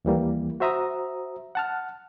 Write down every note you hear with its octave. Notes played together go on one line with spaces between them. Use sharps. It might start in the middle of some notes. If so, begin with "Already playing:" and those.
D#2 E3 G3 A#3
F#4 C5 E5 A#5 D#6
F#5 A5 F6